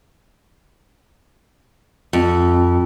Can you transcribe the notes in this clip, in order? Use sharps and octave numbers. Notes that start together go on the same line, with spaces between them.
F2